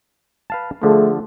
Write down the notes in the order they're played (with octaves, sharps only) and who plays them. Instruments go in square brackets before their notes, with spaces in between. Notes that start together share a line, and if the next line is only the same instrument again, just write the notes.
[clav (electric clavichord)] B4 F5 A5
[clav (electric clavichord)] D3 F3 [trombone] A3 [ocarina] G#4